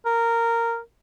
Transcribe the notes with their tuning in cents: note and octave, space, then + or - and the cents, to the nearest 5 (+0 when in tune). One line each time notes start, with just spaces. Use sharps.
A#4 -10